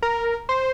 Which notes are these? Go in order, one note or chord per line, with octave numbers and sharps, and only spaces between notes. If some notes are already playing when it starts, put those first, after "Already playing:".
A#4
C5